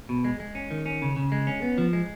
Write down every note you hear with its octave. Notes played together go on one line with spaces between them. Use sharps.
B2
G#3
G#3
C#4
D#3
C#4
C#3
C#3
G#3
C#4
B3
F3
G#3